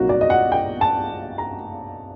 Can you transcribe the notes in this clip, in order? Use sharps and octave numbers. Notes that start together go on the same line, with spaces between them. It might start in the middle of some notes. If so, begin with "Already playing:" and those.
Already playing: C2 A#2 F#3 A#3 D#4 F#4
D5
D#5
F#5
G5
A5
A#5